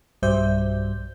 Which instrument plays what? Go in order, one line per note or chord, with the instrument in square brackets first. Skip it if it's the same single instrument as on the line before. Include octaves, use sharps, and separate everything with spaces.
[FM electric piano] B1 G2 G3 C5 E5 G6